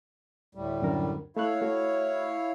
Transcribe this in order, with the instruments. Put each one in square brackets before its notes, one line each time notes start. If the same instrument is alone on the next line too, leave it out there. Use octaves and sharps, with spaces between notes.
[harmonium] D2 A2 G3
[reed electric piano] F#2 D3 A#4
[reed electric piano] A3 E5 F#6 [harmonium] E4 C#5 F5
[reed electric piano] A3 F#4